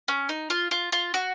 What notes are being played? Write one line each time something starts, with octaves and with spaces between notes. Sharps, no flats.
C#4
D#4
F4
F4
F4
F#4